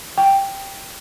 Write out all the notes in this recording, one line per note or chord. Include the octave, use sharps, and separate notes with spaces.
G5